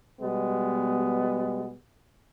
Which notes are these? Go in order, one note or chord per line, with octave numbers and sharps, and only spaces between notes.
B2 G3 G#3 B3